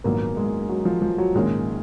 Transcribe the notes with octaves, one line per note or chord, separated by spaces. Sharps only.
A#1 G#2 D#3 F#3 A#3 B3
G#3
F#3
F3
F3
F#3
A#1 G#2 D#3 G#3 A#3 C#4